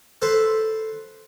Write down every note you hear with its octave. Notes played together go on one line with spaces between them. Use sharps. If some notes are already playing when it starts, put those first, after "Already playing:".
A4 B4 C5